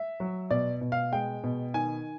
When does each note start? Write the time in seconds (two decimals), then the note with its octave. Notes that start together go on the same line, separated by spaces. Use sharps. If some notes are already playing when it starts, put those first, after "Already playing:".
Already playing: E5
0.20 F#3
0.50 B2 D5
0.81 B2
0.92 F5
1.12 G#3 G5
1.44 B2
1.74 D#3 G#5